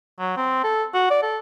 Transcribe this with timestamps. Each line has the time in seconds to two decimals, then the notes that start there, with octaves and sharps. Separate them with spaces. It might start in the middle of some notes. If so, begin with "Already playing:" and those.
0.19 F#3
0.37 C4
0.63 A4
0.94 F#4
1.10 D5
1.22 A4